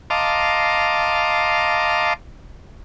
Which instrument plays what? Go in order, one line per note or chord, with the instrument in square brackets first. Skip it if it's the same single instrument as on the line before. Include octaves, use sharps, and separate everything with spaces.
[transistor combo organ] D#5 F5 A5 A#5 C6 D6